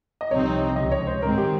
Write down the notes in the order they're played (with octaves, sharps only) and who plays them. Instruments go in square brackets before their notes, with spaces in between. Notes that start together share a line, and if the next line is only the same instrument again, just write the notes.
[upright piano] D#5
[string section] C2 C3 F3 C4 D#4 [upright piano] C#5
[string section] C#2 C3 F3 [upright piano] D#5
[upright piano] C#5
C5
[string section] G#2 D#3 G#3 C4 [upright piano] A#4
[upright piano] G4